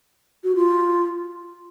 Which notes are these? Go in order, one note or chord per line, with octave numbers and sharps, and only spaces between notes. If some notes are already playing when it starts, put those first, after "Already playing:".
F#4
F4